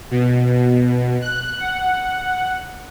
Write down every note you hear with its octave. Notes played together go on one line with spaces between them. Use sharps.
B2
F#6
F#5